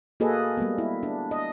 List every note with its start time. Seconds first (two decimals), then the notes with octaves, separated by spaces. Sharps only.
0.20 A#3 F#4 G#4 A4 B4 D#5
0.57 G3 G#3 A#3 B3
0.78 E4
1.03 D4
1.31 D#5